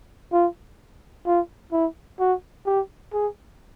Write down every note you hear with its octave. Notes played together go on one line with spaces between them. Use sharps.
F4
F4
E4
F#4
G4
G#4